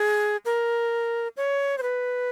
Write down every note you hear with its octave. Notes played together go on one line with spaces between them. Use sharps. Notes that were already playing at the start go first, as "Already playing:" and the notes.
Already playing: G#4
A#4
C#5
C5
B4